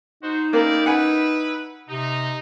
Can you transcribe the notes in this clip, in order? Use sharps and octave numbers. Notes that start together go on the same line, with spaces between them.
D#4 F#4 C5
A#3 E4 G4 A#4 D5
E4 B4 F#5 G#5
C3 D#4